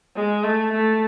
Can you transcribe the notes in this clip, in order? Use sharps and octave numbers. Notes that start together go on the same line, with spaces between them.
G#3
A3
A3